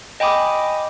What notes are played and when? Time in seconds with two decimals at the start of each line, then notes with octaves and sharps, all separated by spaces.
0.20 D#5 G5 G#5 B5 D6 D#6